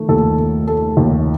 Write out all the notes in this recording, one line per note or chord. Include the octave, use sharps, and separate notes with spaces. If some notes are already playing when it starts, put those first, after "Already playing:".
Already playing: D#3 A3
D#2 A4
A3
A3 A4
D#2